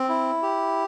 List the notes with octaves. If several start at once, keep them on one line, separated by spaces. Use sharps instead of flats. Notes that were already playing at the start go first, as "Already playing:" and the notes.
Already playing: C4
E4
G4